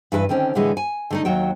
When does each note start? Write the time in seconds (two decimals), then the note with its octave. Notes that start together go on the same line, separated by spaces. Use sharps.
0.12 G2 E3 A#4 B4
0.29 D3 D#3 C4 C#4
0.55 A2 D3 E3 G#3 A3
0.77 G#5
1.10 D3 A3 D#4
1.25 D#2 F#3 F#4 G5